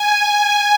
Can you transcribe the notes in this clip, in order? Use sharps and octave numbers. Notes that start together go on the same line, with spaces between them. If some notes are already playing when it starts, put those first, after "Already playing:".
Already playing: G#5
G#5